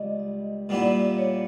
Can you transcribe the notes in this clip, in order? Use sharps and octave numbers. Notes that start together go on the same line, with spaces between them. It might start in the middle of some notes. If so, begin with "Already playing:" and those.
Already playing: C#2 G3 D#5
D#5
A#2 G3 B3 E4
C#5